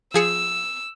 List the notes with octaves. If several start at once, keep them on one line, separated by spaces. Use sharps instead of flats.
F3 G#4 E6 C#7